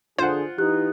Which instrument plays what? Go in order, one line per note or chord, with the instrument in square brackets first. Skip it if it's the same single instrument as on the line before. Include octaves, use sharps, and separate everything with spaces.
[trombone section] D3 G#4 [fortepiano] F4 F#5 [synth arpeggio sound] C5
[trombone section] E3 D#4 [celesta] G4 F#6